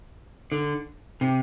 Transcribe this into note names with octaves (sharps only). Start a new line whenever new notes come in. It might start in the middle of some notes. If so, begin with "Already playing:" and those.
D3
C3